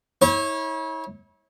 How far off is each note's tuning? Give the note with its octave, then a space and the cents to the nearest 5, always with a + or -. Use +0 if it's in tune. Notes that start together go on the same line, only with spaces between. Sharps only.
E4 -40 C#5 -20